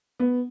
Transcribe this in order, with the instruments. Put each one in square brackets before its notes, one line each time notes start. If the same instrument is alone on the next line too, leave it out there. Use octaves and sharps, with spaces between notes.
[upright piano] B3